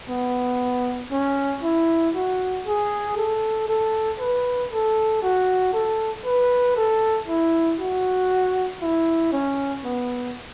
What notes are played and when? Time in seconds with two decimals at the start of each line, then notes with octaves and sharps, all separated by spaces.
0.09 B3
1.11 C#4
1.63 E4
2.15 F#4
2.66 G#4
3.17 A4
3.68 A4
4.20 B4
4.71 A4
5.22 F#4
5.73 A4
6.26 B4
6.76 A4
7.28 E4
7.80 F#4
8.82 E4
9.33 C#4
9.84 B3